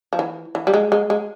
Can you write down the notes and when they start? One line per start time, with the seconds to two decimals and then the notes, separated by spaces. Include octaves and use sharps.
0.13 F3
0.19 E3
0.55 E3
0.67 G3
0.74 G#3
0.92 G#3
1.10 G#3